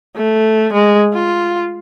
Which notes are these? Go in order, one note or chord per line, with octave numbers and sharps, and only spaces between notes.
A3
G#3
F4